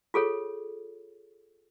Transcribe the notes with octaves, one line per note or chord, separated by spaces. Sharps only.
F4 G#4 A4 C#5